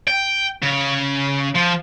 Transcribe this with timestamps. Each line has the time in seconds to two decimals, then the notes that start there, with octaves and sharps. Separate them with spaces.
0.08 G5
0.62 C#3
1.55 F3